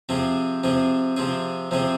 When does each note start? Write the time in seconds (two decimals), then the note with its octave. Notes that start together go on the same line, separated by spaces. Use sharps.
0.09 C3 F3 C4 G#4
0.64 C3 F3 C4 G#4
1.16 C3 F3 C4 G#4
1.71 C3 F3 C4 G#4